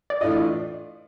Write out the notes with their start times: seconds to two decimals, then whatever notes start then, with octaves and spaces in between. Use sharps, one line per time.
0.10 D5
0.21 A2 E3 A3 D4 F4 D#5